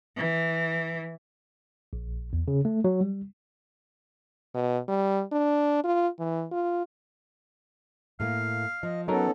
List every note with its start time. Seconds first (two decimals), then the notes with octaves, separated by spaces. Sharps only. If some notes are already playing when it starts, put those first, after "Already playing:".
0.17 E3
1.93 A#1
2.33 E2
2.48 C#3
2.65 A3
2.84 F#3
3.01 G3
4.55 B2
4.88 G3
5.32 D4
5.84 F4
6.19 E3
6.52 F4
8.20 A2 A#3 F5
8.83 F3 D#5
9.08 F#3 B3 C#4 D#4 A4 A#4